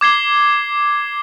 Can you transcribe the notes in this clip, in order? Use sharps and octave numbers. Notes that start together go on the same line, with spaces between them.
D6 G#6 C7 G7